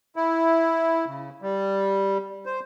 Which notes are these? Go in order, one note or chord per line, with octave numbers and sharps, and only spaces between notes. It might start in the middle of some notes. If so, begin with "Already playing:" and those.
E4
C#3
G3
C5